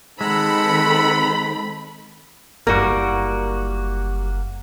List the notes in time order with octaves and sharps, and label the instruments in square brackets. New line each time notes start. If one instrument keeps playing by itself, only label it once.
[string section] D#3 C4 A4 [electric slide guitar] G#3 [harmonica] F#5 A#5 E6 [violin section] B5
[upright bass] F#1 E4 [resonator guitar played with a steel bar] G3 A#4 [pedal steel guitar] A#3 F#4